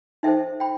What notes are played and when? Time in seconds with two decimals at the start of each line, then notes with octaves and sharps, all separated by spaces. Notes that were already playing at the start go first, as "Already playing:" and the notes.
0.23 D#4 A4 C5 E5 G5
0.60 G5 B5